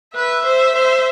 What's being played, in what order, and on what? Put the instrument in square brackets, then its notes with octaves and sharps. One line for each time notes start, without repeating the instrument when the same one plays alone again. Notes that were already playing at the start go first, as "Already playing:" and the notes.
[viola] B4 [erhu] E5
[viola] C5
C5